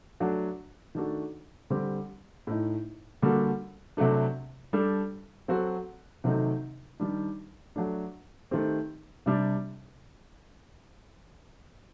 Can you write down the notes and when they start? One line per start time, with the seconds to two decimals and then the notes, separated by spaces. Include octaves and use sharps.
0.20 F#3 A3 D4 F#4
0.95 D#3 A3 D4 F#4 A4
1.70 D3 G3 C4 G4
2.47 A2 A3 D#4
3.22 D3 G3 A#3 F#4 A4
3.97 C3 F#3 A3 D4
4.73 G3 D4 A4
5.48 F#3 C4 F#4 A4
6.24 C3 D#3 F#3 A3 D#4
7.00 D#3 G3 D4
7.76 F#3 A3 D4
8.51 D#3 A3 C4 G4
9.26 C3 G3 D4